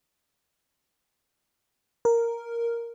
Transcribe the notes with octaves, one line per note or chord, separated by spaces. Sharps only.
A#4